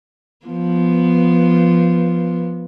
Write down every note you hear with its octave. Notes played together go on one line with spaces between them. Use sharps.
F3 B3